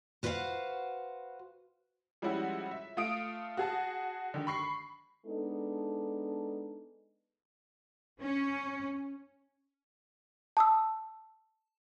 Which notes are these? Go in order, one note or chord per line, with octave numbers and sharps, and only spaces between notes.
F#4 B4 C5 D5 F5 F#5
F3 G3 G#3 C#4 E4 F#4
E5
A3 F4 F5 D#6 D7
F#4 G#4 A5
D3 D#3
B5 C#6 C7
G#3 B3 D4 D#4 A4
C#4
A5 D#6 E6